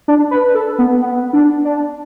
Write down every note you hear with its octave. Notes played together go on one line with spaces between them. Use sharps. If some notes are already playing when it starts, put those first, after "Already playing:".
D4
B4
A4
B3
B3
D4
D4